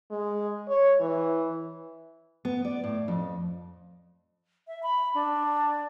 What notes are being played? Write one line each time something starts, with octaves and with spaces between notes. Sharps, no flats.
G#3
C#5
E3
B3
D5
A2
F2
E5
B5
D4